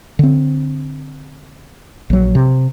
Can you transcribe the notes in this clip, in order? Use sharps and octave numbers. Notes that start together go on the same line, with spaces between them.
D3 C4
A#1 F#3
C3